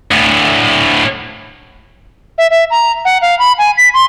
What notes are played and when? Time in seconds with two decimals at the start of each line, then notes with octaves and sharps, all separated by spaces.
0.11 D2 A2
2.38 E5
2.50 E5
2.71 A#5
3.05 F#5
3.22 F5
3.39 B5
3.59 G#5
3.78 B6
3.94 C6